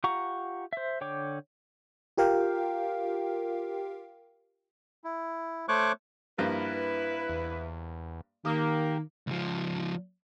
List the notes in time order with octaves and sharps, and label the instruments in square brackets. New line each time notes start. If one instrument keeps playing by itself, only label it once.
[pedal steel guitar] F4 G4 F#5 A#5 C#6
C5 E5
D3 C#5 G5 D6
[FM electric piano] F4 G4 A#4 F5 G5
[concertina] E4
A3 C5 C#5 C#6 D6 F#6
[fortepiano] G2 F3 A#3 [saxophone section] E4 B4
[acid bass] E2
[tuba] D#3 [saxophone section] A#3 [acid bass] G4 [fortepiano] D#6
[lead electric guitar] C#2 F3